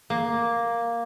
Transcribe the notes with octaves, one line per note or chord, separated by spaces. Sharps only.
A#3